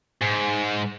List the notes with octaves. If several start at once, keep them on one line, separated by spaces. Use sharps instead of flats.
G#2